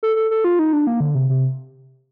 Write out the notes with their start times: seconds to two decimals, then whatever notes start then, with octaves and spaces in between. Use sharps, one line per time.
0.03 A4
0.16 A4
0.31 A4
0.44 F4
0.59 D#4
0.73 D4
0.87 A#3
1.00 D3
1.15 C3
1.30 C3